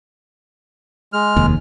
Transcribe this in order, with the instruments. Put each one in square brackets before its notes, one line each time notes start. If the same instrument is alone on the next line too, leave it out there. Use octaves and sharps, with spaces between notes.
[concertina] G#3 F6
[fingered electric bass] F1 D#2